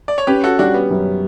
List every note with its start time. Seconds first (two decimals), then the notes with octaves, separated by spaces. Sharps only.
0.08 D5
0.18 C#5
0.27 C#4 G4 B4
0.44 F#4 A4
0.59 G3 D4 F#4
0.74 B3
0.90 F#2